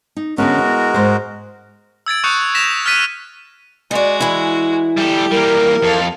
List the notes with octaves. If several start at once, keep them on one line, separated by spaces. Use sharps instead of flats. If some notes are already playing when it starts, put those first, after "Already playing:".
D#4
D3 G#3 B3 C#4 F#4 A#4
E4
G#2 C5
E6 G#6 A6 D7
C#6 D#6 F#6 G6 C#7
A#6 B6 E7 F7
F6 F#6 A6 B6 D#7
G#3 F#4 D5 D#5
E3 E4
G3 G4 A4
G3 A#3 A#4
F2 A4 F5